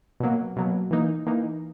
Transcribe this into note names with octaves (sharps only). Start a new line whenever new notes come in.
B2 F#3 A#3
B2 F#3 A#3
E3 A#3 D#4
E3 A#3 D#4